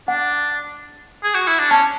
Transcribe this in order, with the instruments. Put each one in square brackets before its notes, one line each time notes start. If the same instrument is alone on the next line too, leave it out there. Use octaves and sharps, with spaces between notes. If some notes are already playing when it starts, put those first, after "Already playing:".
[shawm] D4 [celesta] F#5
[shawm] G#4
F#4
E4
D4
[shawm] C#4 [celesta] A5